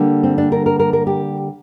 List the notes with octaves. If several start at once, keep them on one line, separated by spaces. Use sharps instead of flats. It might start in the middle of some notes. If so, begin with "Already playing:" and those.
Already playing: D3 G3 A#3
C4
D4
A#4
A#4
A#4
A#4
G4